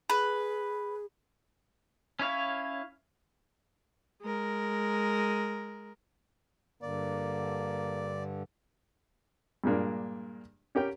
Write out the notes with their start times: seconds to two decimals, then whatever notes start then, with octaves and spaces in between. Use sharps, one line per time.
0.10 G#4 B4
2.19 C#4 E4 C#5 F5
4.22 G#3 A#4
6.82 G2 D3 A#3 D5
9.64 G2 A#2 G#3 A#3 D4
10.75 C#4 G4 A#4 G5